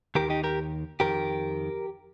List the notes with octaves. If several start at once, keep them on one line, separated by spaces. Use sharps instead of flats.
D#2 D#3 G4 A#4
D#4 G4
G4 A#4
F2 D#3 G4 A#4